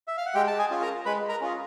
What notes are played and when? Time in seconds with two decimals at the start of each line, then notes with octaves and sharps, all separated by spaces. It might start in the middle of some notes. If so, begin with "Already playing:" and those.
0.08 E5
0.17 F5
0.26 F#5
0.34 G#3 G4 G5
0.47 A5
0.58 G#4 G#5
0.71 C#4 F4 G#4
0.82 A#4 A#5
1.05 G#3 B4 B5
1.29 A#4 A#5
1.41 C#4 F4 G#4